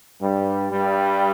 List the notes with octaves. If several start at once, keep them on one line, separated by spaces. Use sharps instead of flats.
G2 G3
G2 G3